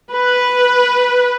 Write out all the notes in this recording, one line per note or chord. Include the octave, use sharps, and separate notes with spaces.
B4